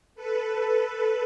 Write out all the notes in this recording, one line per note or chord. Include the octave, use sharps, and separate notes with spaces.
A4 B4